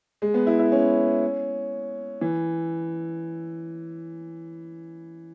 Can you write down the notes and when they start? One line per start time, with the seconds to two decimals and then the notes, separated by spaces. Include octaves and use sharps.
0.22 G#3
0.34 B3
0.47 E4
0.59 E4
0.72 C#4
2.21 E3